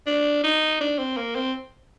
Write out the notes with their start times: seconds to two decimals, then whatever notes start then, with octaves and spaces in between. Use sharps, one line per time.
0.06 D4
0.44 D#4
0.81 D4
0.98 C4
1.17 A#3
1.35 C4